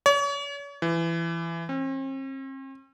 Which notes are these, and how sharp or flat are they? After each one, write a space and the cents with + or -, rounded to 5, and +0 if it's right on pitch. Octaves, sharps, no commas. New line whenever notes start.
C#5 +40
E3 +20
C4 +45